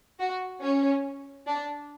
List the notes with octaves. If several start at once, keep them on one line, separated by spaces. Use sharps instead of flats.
F#4
C#4
D4